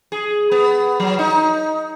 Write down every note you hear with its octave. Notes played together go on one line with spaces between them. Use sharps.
G#4
B3
F#3
D#4